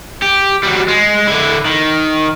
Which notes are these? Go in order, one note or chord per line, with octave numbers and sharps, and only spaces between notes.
G4
F#3 G3
G#3
D3 E4
D#3